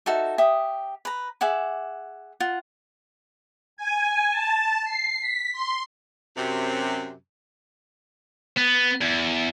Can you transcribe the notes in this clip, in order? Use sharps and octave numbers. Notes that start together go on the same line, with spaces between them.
D#4 F#4 A4 E5
G4 E5 D#6
B4 A#5
G#4 E5 F#5 D6
F4 F#5
G#5
A5
C7
B6
C6
F#2 C3
B3
E2